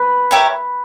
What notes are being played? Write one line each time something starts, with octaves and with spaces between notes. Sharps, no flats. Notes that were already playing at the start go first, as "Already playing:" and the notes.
Already playing: B4
E4 G4 A#4 C#5